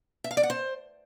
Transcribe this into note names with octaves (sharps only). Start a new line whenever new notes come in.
E5
F5
D5
F#5
C5